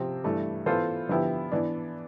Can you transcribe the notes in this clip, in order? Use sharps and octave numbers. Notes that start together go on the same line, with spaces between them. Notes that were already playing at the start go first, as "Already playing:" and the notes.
Already playing: C3 F3 C4
G2 E3 A3
E3 B3 F4 A4 C5
D3 F3 B3 E4 G4
E3 B3 D4